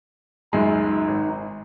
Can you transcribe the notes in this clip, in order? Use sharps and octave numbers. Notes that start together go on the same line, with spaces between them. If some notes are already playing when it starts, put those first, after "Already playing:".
C#2 F#2 G#3 D#4
G#1